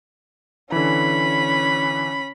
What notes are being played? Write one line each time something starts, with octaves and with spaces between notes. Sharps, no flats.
D3 E3 C#4 B5